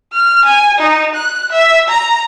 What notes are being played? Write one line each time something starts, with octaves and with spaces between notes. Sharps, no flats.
F6
G#5
D#4
F#6
E5
A#5